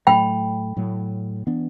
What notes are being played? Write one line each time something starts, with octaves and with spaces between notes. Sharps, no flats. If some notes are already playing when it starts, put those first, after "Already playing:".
A2 F#3 A3 G5 B5
A2 F#3 A3
E3 B3 D4